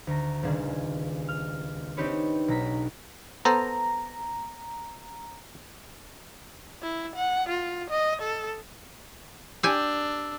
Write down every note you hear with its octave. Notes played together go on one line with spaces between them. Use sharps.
D2 A#5
D#1 C#2 D4 G#4
F6
C4 D4 D#4 G4 B4 C#5
B1 A#5 B6
B3 A4 C5 A#5
E4
F#5
F4
D#5
A4
D4 G4 G#5 E6